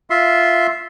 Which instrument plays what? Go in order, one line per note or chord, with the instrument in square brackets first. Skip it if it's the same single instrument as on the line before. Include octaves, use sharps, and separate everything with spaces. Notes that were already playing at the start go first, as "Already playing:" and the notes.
[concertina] F4 E5 C6